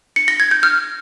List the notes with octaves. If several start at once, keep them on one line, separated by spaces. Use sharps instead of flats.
C#7
A#6
G#6
G6
F6